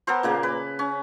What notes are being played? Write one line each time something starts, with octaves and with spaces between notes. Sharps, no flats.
B3 A4 A#4 C5
A#2 C#3 A#3
B4
C#4